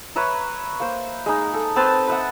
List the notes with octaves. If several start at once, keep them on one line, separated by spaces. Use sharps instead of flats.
B4 C#5 E5 A#5
A#3 C5
G#3 D#4
A4
C4 B4 A5 C6
B4 E5 F#5